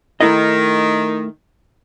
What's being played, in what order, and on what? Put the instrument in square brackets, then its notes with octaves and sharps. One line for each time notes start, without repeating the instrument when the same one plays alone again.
[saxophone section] D#3 [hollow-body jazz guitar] A3 E4 D#5